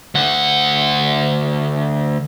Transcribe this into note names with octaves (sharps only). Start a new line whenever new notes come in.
D2 F#5